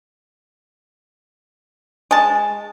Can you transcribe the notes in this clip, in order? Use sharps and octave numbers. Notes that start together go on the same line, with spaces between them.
G#3 A5